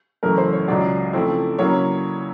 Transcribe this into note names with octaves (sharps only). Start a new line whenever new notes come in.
F#2 C#3 E3 A3 C#4 A#4
C5
C#5
C#2 C#3 F#3 D5
C#3 F3 A3 C4 E4
C#3 F#3 A#3 C#4 E4 C#5